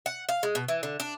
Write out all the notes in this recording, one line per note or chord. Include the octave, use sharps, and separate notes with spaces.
F#5
F5
G#3
B2
E3
D3
D4